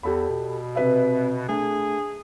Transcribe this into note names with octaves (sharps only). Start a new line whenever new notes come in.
E2 G4 A4 B5
B2
C3 B4 E5
A3 D4 G#4